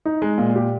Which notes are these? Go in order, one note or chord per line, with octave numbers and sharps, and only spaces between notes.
D#4
G#3
A#2
G4